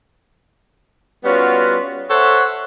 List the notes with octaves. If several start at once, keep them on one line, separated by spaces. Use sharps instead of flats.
G3 B3 C#4 F4 F#4
A4 C5 C#5 E5 F#5